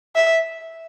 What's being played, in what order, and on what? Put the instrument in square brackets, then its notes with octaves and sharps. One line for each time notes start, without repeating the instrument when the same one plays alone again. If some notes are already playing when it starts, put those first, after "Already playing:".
[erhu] E5